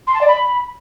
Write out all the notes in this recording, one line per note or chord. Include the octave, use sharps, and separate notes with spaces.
C6
A5
D5
B5